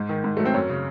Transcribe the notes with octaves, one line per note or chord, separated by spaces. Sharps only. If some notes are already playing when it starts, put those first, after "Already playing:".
Already playing: G#2
D#3
G#2
F#3 A3
C4
F#2 C#4
C#3